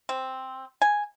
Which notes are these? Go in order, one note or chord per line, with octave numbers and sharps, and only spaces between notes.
C4
G#5